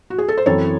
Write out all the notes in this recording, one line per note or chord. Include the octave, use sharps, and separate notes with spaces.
F#4
G#4
A4
C5
F#2 E3 C4 A4 C#5